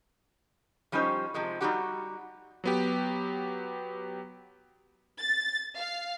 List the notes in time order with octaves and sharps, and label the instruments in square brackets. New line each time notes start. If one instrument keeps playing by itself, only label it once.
[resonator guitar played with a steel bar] F3 G3 C#4 D#4 G4 C5
C3 F3 G#3
G3 G#3 D#4 F#4 G4 F#5
[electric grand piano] F#3 B3 G4
[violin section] A6
F5